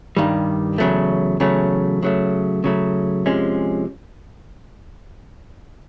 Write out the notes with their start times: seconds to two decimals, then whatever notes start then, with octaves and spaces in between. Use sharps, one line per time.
0.17 G2 D#3 G3
0.78 E2 C#3 F#3 A3
1.40 E2 C#3 F#3 A3
2.03 C#3 F#3 A3
2.64 C#3 F#3 A3
3.26 C3 F3 G#3 C#4